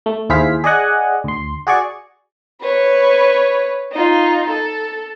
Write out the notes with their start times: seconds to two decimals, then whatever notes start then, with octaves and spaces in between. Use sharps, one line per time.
0.06 A3
0.30 D#2 E4 G#4 C5 F5 B6
0.64 G#4 D5 D#5 F#5 G#5
1.24 D2 C6
1.67 F#4 G#4 D5 C#6
2.61 B4 C#5
3.92 D#4 F4
4.50 A4